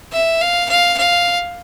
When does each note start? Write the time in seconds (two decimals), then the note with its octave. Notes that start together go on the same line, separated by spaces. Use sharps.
0.12 E5
0.41 F5
0.70 F5
0.98 F5